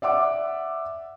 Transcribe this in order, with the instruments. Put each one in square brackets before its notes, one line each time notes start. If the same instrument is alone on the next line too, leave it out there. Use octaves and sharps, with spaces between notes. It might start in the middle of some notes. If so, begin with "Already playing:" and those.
[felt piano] D5 E5 F#5 D6